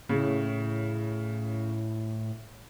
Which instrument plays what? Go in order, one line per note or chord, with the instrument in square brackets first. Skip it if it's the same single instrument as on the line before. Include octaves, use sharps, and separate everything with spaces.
[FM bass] A2 [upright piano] C#3